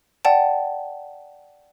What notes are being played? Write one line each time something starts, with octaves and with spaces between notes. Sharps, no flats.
D5 F#5 G5 A5